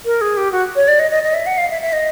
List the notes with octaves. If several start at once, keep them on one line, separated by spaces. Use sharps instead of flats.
A#4
G#4
G4
F#4
C#5
D5
D#5
D#5
D#5
E5
F#5
F5
E5
E5
D#5